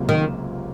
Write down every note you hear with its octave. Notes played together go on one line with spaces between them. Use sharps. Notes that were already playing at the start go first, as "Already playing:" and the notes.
Already playing: C#2 C3 F#3 A#3 F4
D#3